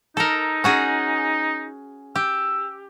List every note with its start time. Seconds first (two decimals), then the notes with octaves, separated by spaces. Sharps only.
0.17 D#4 A4 A#4
0.64 C#4 F#4 G#4
2.16 G4 E6